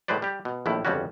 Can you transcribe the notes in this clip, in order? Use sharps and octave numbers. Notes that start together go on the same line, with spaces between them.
A2 F#3 G#3 B4 C5 D5
G3 G4
B2
A#1 D#2 A2 E4
G1 F2 C#3 G3 C#4 F#4